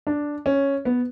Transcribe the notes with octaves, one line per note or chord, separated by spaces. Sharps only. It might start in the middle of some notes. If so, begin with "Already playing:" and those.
D4
C#4
B3